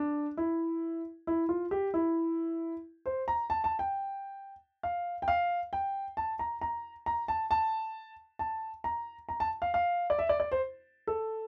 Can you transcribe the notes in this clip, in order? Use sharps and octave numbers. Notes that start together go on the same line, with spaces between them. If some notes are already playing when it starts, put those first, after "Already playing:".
Already playing: D4
E4
E4
F4
G4
E4
C5
A#5
A5
A5
G5
F5
G5
F5
G5
A5
A#5
A#5
A#5
A5
A5
A5
A#5
A#5
A5
F5
F5
D5
E5
D5
D5
C5
A4